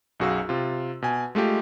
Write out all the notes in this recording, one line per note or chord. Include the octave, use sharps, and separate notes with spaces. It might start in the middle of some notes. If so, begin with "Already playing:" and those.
B1 F#2 F#4 G#4 F5 E6
C3 F4
B2 G#5
G#3 A3 F4 G4